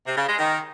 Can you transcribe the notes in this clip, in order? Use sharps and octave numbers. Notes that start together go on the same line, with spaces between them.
C3
C#3
G#3
D#3